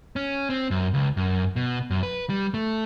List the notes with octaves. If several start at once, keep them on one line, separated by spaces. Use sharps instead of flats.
C#4
C4
F#2
C#2
F#2
B2
F#2
B4
G3
A3